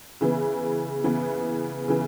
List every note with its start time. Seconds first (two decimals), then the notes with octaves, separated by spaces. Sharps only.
0.21 C#3 E3 B3
1.04 C#3 E3 B3
1.88 C#3 E3